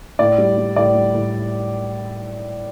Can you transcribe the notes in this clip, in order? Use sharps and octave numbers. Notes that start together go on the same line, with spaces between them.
A2 D5
G3
G3
A2 D5
G3
A2